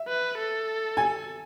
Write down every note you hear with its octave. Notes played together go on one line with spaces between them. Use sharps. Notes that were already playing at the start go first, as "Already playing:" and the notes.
Already playing: E5
B4
A4
G#5